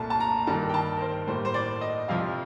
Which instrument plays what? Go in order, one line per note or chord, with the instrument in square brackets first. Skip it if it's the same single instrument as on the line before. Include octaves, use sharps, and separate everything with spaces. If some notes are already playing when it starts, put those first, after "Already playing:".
Already playing: [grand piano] C2 A#2 A3 A5
A5
A#5
G2 D#3 G3 A#3 A5
G5
A5
A#4
C5
A2 G3 A#3 C5
C5
D5
D#5
F2 C3 F3 F5